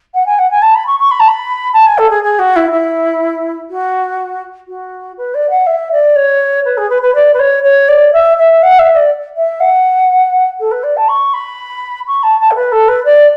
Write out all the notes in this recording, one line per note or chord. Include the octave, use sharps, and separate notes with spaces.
F#5
G#5
F#5
G#5
A5
B5
C#6
C#6
B5
A5
B5
A5
G#5
A4
G#4
G#4
F#4
E4
E4
F#4
F#4
B4
D5
F#5
E5
D5
C#5
B4
G#4
B4
B4
D5
B4
C#5
C#5
D5
E5
E5
F#5
E5
D5
E5
F#5
A4
B4
D5
A5
C#6
B5
C#6
A5
A5
A4
B4
A4
B4
D5